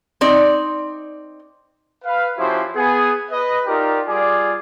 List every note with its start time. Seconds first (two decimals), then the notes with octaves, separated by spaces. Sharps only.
0.21 C4 D#4 D5
2.04 B4 F5
2.37 F3 C#4 E4 F#4 G4 C5
2.76 B3 G#4
3.31 B4 D#5
3.66 D#4 F4 G4 A#4 D5
4.08 G3 F4 G#4 D5